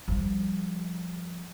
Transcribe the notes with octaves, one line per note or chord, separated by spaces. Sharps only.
F3 G3